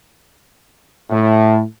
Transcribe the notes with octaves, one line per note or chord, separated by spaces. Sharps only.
A2